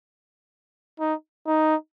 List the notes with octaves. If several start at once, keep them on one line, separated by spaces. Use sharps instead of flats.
D#4
D#4